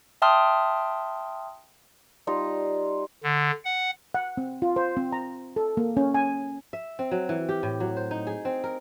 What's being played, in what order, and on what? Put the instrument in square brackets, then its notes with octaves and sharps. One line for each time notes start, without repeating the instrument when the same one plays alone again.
[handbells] E5 G5 A5 C6 D#6 F6
[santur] G3 D#4 F4
[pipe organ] D3
F#5
[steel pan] F#5
C4
F4
C5
C4
A#5
A4
A#3
C#4
G#5
[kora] E5
C4
F#3
E3
G4
A2
F#3
C5
D#4
G#4
C4
A#4